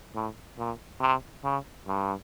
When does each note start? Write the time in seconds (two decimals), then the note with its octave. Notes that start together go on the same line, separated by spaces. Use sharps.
0.15 A2
0.58 A#2
1.00 C3
1.44 C#3
1.87 G2